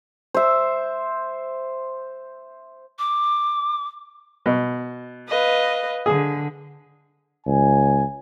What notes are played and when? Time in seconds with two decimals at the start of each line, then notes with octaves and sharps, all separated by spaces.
0.34 C5 E5
2.99 D6
4.46 B2
5.28 B4 D#5 F5
6.06 D3 G#4
7.46 C#2 G#5